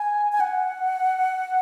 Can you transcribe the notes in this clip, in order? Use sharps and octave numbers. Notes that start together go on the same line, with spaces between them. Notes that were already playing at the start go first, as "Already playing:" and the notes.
Already playing: G#5
G#5
F#5